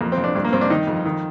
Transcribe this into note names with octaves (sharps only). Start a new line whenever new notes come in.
F2 A#3
C4
F2
D4
G2 D4
A#3
G2 C4
D4
D#3 D#4
F2
D#3